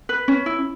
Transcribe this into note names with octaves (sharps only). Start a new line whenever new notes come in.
B4
C#4
E4